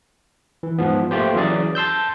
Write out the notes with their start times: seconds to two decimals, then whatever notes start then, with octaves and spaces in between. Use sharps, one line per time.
0.63 E3
0.78 G#2 F3 B3
1.11 A3 A#3 F4 G4 C5
1.33 E3 F#3 C#4 G#4 D5
1.75 A5 C6 E6 G6